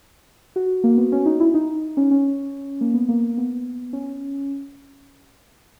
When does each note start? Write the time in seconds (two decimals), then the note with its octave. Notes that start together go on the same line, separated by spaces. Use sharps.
0.56 F#4
0.84 A#3
0.98 B3
1.12 C#4
1.26 D#4
1.40 E4
1.54 D#4
1.97 C#4
2.11 C#4
2.81 A#3
2.94 B3
3.09 A#3
3.38 B3
3.93 C#4